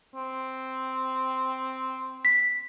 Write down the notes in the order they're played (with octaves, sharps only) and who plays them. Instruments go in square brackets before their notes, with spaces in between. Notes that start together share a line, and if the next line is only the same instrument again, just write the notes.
[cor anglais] C4
[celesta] B6